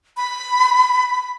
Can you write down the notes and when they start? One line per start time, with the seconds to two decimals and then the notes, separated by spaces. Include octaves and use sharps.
0.17 B5